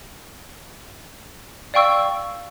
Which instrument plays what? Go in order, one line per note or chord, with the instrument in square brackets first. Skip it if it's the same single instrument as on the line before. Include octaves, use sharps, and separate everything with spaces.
[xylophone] D5 F5 G5 C#6 E6